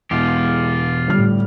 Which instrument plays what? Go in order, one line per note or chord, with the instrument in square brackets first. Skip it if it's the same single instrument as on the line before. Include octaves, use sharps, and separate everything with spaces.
[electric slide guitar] E2 B2 [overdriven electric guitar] F4 G4
[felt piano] G1 F6 [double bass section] A2 G3